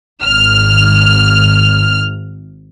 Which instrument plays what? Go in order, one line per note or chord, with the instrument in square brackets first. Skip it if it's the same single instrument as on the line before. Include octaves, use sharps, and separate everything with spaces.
[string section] G#1 F6